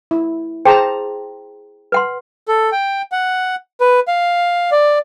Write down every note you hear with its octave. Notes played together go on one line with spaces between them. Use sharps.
E4
G#4 C5 G5 A5 A#5
B4 F#5 C6
A4
G5
F#5
B4
F5
D5